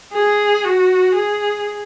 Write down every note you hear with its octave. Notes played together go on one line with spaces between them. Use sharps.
G#4
F#4
G#4